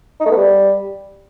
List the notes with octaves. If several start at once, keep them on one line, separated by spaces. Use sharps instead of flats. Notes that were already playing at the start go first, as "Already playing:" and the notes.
D#4
A3
B3
G3